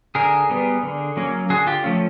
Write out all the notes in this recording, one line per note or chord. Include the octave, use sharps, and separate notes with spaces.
D3 G#4 A#4
G3 B3
D3
F#3 A#3 C#4
D3 F#4 G#4
F4 G4
F3 A3 C#4